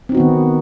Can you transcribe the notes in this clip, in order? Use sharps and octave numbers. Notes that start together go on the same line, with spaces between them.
D#3 B3 C4 D#4 F#4